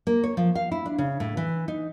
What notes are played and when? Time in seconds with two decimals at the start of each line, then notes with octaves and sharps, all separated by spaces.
0.07 A#3
0.23 C#5
0.37 F3
0.55 F5
0.72 E4
0.86 D4
0.98 C#3
1.20 A2
1.37 E3
1.68 D#4